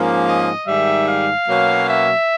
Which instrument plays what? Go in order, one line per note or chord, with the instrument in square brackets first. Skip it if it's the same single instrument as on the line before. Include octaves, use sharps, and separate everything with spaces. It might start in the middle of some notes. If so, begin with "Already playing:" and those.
Already playing: [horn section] G#2 F3 A#3 C#4
D#5
G#2 D#3 G3 E5
F5
B2 F#3 A#3 C#4
E5